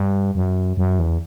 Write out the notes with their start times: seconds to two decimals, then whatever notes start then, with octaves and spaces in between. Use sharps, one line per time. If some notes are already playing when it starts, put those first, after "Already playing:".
Already playing: G2
0.35 F#2
0.77 F#2
0.99 E2